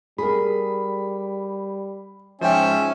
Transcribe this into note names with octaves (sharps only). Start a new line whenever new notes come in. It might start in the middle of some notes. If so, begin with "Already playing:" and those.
G3 G#4 A#4 B5
G#2 F3 C#4 E5 G5 G#5